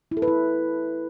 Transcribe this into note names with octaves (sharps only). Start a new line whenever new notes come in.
E4
A4
B4
E4